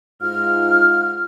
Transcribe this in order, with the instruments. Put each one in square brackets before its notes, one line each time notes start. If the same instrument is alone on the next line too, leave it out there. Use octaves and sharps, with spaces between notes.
[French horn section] G#2 F4 [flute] F6